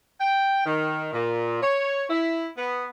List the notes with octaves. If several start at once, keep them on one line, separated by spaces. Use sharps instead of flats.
G5
D#3
A#2
C#5
E4
B3